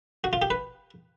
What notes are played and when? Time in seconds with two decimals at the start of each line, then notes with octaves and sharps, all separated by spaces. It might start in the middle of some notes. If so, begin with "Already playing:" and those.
0.24 F#4
0.33 F4
0.42 G4
0.50 B4